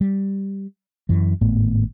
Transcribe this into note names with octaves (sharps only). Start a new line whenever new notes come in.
G3
F#2 E3
G#1 A2 A3 B3